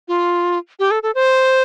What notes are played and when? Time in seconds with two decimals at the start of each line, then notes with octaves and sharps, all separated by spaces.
0.08 F4
0.79 G4
0.91 A4
1.03 A4
1.15 C5